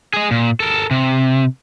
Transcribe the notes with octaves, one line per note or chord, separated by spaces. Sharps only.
G#4 D#5
A#2
A4 A#4
C3